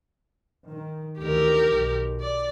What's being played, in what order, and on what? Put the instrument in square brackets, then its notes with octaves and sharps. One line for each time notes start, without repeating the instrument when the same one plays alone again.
[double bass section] D#3
[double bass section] D2 D#3 E3 [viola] G4 A#4
[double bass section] B1
[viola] D5